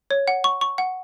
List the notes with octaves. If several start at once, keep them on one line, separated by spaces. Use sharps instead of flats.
C#5
F#5
C#6
C#6
F#5